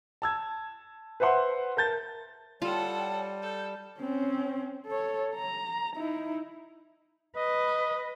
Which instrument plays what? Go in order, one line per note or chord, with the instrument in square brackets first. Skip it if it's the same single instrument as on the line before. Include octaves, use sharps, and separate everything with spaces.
[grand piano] A5 E6 G#6
B4 C5 E5 F#5 C6
A#4 A5 G6 A6
[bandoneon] G3 [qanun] F4 [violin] A4 F#5 [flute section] C#5 G5 A5
[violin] A4 [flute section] G6
[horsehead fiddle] C4 C#4
A4 C#5
A#5
D#4 E4
[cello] B4 [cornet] D#5